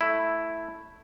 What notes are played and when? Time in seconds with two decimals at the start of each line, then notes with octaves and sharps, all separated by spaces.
0.01 A3 E4